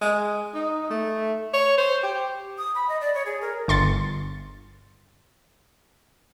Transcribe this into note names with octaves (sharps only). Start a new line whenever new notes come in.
G#3
D#4
A3
C#5
C5
G4
D#6
B5
D#5
D5
C#5
G#4
A#4
G1 C6 A6 C#7